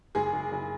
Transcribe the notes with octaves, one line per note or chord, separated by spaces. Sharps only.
F#1 G#3 G#4
F#1
F#1